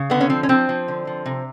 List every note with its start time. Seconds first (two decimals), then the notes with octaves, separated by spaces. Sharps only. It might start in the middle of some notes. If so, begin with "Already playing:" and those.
Already playing: C#3
0.10 D3 B3
0.21 C#4
0.30 F3 C4
0.43 C#4
0.49 F3 C4
0.69 F3
0.88 D3
1.07 F3
1.26 C3